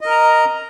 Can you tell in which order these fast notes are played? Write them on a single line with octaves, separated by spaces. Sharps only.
D#5 A#4 A#5